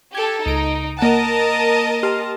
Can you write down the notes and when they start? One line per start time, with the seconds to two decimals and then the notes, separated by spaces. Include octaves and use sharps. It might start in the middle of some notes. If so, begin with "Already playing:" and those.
0.15 G4 A4 G#6
0.46 C#2 D#4 D7
0.99 A#3 A#4 D#5 F#5 A5
2.03 G4 C6 F6